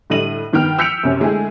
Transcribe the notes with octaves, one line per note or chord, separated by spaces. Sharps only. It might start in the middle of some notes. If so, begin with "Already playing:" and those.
A2 D3 G3 D#5 D#7 F#7
G2 D#3 B3 G5 F6
E6 G6 B6 C#7 D7 F7
F#2 C3 C#4
D3 G#3 A3 E4 G#4